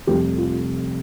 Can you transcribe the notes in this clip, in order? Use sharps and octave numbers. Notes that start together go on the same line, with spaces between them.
F1 F2 C3 G3 G4
F4